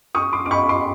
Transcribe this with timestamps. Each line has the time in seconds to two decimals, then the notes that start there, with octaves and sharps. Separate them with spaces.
0.15 C#6 D#6
0.33 C6 D6
0.46 D6
0.51 B5 C#6
0.69 C6 D6